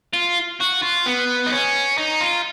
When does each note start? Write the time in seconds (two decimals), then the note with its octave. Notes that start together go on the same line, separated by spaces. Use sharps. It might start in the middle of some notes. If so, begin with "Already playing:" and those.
0.13 F4
0.60 F#4
0.82 F4
1.06 B3
1.46 D#4
1.52 C#4
1.98 D#4
2.21 F4